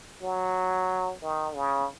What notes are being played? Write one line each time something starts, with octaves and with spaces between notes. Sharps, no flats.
F#3
D#3
C#3